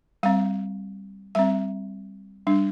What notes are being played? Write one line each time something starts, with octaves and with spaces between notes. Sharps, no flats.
G3 C4 F5
G3 C4 E5
G3 D4